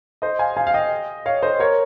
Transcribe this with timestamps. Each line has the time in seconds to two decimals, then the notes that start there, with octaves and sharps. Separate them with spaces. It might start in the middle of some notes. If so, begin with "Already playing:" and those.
0.22 C5 D#5
0.39 F5 G#5
0.57 F5 G#5
0.67 F5
0.74 D#5 G5
1.26 C#5 F5
1.42 C5 D#5
1.59 A#4 C#5